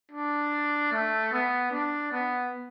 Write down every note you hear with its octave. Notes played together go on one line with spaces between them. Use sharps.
D4
A3
B3
D4
B3